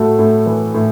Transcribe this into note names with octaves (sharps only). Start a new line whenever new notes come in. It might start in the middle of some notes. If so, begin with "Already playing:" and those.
Already playing: A2 A3 F#4 A4
A2
E3
A2